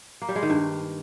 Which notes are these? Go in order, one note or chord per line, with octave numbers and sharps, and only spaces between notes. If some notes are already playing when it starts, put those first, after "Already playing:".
A#3
G3
G#3
D#3
G2